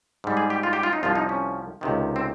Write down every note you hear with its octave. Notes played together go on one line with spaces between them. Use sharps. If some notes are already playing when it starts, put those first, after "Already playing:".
G#2 G3
G#4
G4
F4
G4
F4
D#4
C2 C3 F3 F4
D#4
C#4
C#2 C3 D#3
C4